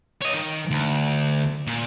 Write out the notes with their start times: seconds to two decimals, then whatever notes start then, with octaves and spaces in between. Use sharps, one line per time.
0.22 C#5 D#5
0.34 D#3
0.71 D2
1.67 A#2